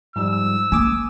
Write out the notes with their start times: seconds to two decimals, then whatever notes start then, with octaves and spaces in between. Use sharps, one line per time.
0.16 G#2 F3 G3 E6
0.72 A#3 G#5 D6 D#6